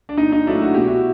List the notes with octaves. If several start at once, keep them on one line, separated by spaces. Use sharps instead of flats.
D4
A#2 D#4
D#4
F#3 A3 D4 E4
F#4
B2 G4
E4 F#4